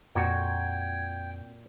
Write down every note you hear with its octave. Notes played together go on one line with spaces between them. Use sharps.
F2 A#2 F#4 G5 G#6